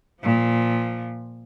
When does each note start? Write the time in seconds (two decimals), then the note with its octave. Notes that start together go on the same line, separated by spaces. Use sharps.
0.22 A#2 F3